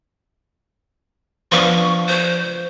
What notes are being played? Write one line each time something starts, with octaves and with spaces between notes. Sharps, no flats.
F3 B3 D4 C#6
C5